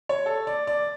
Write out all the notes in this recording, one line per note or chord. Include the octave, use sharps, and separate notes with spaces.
C#5
A4
D5
D5